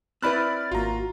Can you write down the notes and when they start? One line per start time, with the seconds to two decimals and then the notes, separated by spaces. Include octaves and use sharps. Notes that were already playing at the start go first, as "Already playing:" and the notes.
0.22 C4 E4 B4 D5 B5 F6 F#6 A6
0.72 G#1 A#3 F4 F#4 A#5